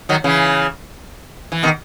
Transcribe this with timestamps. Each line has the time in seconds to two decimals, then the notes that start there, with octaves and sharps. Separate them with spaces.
0.09 D#3 F#3
0.24 C#3 E3
1.52 E3
1.63 B2 D#3